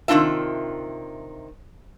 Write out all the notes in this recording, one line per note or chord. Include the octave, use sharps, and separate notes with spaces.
C3 D#3 G3 D4 F4 E5